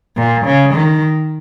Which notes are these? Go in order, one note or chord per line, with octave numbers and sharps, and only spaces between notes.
A#2
C#3
D#3